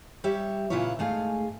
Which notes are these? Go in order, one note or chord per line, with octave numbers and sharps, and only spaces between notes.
G3 G4 C#5 E5
A#2 C#3 E4 F4 B4 C#5
G#2 A3 G#4 F5